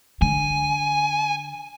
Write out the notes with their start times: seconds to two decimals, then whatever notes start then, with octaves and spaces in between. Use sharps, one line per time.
0.22 D3 G#5